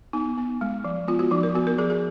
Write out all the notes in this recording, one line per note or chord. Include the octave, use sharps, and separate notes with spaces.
B3 D#4
B3
G#3
F3
B3 F4
F#4
F3 D#4
A#4
B3 F#4
A#4
F3 G#4
G#4